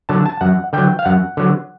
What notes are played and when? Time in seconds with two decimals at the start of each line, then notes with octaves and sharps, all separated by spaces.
0.09 D3 F#3 A5
0.26 A5
0.41 F#2 F#5
0.73 D3 F#3 G5
0.99 F5
1.05 F#2 F#5
1.37 D3 F#3